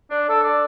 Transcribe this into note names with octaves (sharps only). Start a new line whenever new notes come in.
D4
D4 A4
D5